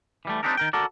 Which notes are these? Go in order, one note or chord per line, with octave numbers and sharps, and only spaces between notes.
E3 G3 A3
C4 D4 D#4 G4 A4 A#4
D#3 A#4 G5
F#4 A4 A#4 D5